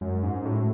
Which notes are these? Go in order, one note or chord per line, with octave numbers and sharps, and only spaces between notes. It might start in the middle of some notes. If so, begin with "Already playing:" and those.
F#2 G#3
G#2 C#4
A2 F#4